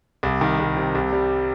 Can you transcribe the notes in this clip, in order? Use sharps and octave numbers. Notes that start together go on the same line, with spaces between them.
C2
D#3
C2
C3
C2
G3